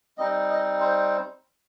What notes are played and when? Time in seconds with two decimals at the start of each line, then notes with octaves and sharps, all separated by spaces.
0.18 G3 C4 D#4 D#5
0.49 D#5
0.80 C5